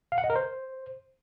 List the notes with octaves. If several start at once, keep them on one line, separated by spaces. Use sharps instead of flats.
F5
F#5
D#5
A#4
C5